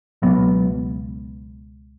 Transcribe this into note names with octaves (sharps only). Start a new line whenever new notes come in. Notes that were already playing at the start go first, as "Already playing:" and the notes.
C#2 B2 F#3 B3